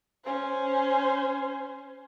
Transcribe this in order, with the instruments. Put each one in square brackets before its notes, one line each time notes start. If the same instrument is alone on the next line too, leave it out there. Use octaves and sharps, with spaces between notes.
[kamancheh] C#4 C5